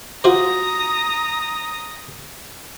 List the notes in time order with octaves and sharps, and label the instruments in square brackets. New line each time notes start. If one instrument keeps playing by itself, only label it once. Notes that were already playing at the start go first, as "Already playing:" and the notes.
[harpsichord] F4 F#4 C5 [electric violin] A#5 D#6